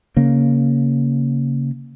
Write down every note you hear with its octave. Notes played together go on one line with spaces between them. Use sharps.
C#3 A#3